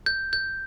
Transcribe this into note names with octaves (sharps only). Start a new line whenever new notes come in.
G6
G6